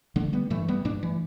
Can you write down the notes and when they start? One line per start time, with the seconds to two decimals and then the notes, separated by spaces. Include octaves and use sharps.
0.16 D3 A3 D4
0.33 G3 B3
0.50 G2 E3 A3
0.68 G3 B3
0.85 G2 A3 D4
1.03 E3